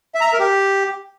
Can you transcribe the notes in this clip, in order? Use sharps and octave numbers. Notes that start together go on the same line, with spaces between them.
E5
A#5
E5
A#4
G4